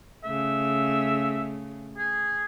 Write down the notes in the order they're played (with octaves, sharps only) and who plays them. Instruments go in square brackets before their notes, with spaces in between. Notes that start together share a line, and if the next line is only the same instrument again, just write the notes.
[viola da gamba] C#3 A3 [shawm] E5
[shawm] G#4